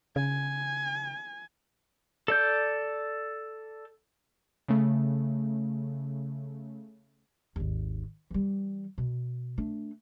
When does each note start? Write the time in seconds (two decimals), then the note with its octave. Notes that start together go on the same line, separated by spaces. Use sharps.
0.16 C#3 G#5
2.28 A4 D5 G6
4.68 C#3 A3
7.56 G#1 D#2
8.31 E3 G3
8.98 B2
9.58 A3 D4